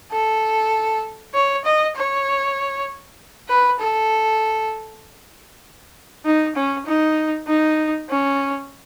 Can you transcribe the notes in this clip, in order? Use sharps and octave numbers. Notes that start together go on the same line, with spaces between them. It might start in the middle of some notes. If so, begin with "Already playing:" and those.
A4
C#5
D#5
C#5
B4
A4
D#4
C#4
D#4
D#4
C#4